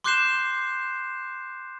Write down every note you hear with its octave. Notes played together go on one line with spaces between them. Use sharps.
C6 D6 F#6 G6 C7 E7